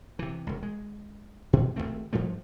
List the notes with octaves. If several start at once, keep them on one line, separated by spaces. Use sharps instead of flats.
C3 E3
E1 C#2
G#3
B2
G#1 G#2 A3 C4
G#2 F3 G3 A3